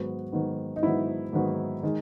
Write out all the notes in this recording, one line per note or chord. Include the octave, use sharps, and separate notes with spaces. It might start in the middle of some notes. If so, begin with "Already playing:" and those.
Already playing: G#2 D#3 F#3 B3 F#4
G#2 D#3 F#3 B3
D#4
G#2 D#3 F#3 B3 E4
G#2 D#3 F#3 B3
D#3 G#3